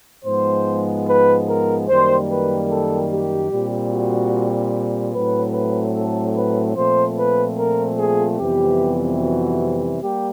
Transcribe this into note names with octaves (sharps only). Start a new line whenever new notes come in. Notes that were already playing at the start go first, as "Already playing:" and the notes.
G#2 F3 G#3 B3 C5
B4
A#4
F#2 D#3 G3 A#3 C5
B4
A4
G4
A#2 G3 C4
F#4
A2 F#3 A3 C4 B4
B4
A4
B4
A#2 F3 A3 C4 C5
B4
A#4
G#4
F2 C3 E3 G3 B3 G4
F#4
G3 A#3 G4